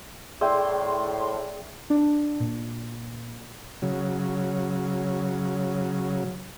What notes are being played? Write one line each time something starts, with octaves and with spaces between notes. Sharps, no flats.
A2 G#4 D5 E5 G5 C6 E6
D4
A#2
C#3 F#3